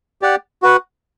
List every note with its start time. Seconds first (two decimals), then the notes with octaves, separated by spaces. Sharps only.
0.22 G4 D5 F#5
0.62 F#4 B4 F#5